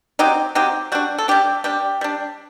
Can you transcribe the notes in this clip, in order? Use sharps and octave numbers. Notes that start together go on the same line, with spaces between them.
F#3 C4 D#4 G4
F#3 C4 D#4 G4
G3 D4 F#4
A4
G3 D4 G4
G3 D4 G4
G3 D4